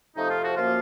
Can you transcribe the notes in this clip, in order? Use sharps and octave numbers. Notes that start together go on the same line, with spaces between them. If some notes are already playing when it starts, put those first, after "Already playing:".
F2 C3 F3 A3 D#4
F4
F#4
F#2 F3 A#3 F4